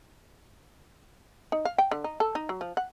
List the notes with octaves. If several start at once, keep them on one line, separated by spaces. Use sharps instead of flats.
D#4
F5
G5
D3
D#4
A4
D#4
F#3
F3
F#5